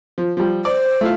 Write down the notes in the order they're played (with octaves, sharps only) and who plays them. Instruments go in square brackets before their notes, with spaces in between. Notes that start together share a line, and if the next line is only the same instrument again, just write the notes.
[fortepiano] F3
F3 G3
[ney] C5 [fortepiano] D5
[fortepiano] A3 E4 F4